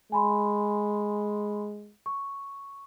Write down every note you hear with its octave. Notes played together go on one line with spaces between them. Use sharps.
G#3 G#5 B5 C6
C#6